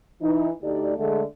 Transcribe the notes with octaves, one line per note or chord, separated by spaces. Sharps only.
E3 D#4
D2 A3 D#4 G4 D5
D3 G#3 A3